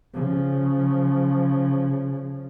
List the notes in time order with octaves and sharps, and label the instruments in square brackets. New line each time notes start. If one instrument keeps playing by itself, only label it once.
[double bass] C#3 F3